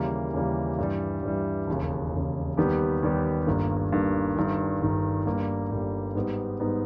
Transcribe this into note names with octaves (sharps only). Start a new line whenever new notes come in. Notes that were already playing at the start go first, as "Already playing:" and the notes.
Already playing: D#2 C#3 E3 G3 A#3
D#2 C#3 E3 G3 A#3
G2 E3 G3
G2 E3 G3
E1 D#2 C#3
E1 D#2 C#3
D#2 D#3 G3 B3 G4
D#2 D#3 G3 B3 G4
G1 G2 D#3 A#3
G1 G2 D#3 A#3
G1 G2 D#3
G1 G2 D#3
G1 G2 G3 A#3
G1 G2 G3 A#3
G#2 G3 B3 D#4
G#2 G3 B3 D#4